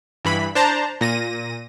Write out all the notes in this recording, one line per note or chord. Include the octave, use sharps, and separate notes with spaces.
G2 E3 B5
D4 C5 A5 A#5
A#2 A#6 D#7